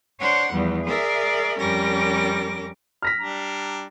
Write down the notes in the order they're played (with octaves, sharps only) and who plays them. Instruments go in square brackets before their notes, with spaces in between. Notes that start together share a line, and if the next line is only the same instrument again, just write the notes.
[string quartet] D4 C5 C#5 F#5
E2 F3 G3
G#4 A#4 D5 E5
F2 G3 C#4 A#4 D6 A#6
[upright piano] F6 A#6 B6
[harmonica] G3 D4 A#5